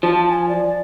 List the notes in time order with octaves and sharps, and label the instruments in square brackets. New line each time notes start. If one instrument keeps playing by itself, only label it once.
[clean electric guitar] F3 [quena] A5
[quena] G#5
D5